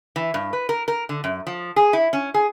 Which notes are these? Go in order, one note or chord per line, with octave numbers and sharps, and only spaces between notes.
E3
G2
B4
A#4
A#4
D3
F#2
F3
G#4
E4
C#4
G#4